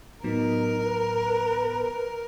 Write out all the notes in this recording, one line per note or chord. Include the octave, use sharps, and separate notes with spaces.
A2 F#3 B3 D#4 A#4
B4